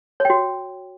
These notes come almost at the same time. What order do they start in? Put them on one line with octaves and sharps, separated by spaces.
C#5 G5 F#4